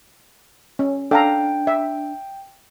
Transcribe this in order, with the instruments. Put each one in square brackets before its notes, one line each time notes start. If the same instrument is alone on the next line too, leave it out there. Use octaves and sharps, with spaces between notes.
[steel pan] C#4
[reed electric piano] D4 [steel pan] A4 F5 A#5 [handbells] G5
[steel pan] E5